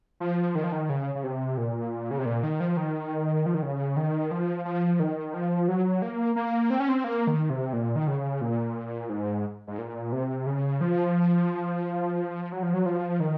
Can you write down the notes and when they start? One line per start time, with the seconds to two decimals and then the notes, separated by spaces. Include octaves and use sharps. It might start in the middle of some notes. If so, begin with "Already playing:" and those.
0.20 F3
0.55 D#3
0.64 F3
0.72 D#3
0.89 C#3
1.15 C#3
1.24 C3
1.58 A#2
2.11 C#3
2.18 C3
2.26 A#2
2.43 D#3
2.60 F3
2.77 D#3
3.46 F3
3.54 D#3
3.62 C#3
3.97 D#3
4.31 F3
4.65 F3
5.00 D#3
5.34 F3
5.68 F#3
6.02 A#3
6.36 A#3
6.70 C4
6.80 C#4
6.89 C4
7.04 A#3
7.27 D#3
7.50 C3
7.73 A#2
7.96 D#3
8.07 C#3
8.41 A#2
9.09 G#2
9.67 G#2
9.78 A#2
10.12 C3
10.46 C#3
10.81 F3
12.52 F#3
12.63 F3
12.74 F#3
12.86 F3
13.20 D#3